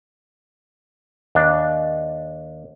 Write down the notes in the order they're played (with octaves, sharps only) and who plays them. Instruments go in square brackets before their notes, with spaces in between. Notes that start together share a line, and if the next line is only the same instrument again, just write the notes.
[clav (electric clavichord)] D#2 D4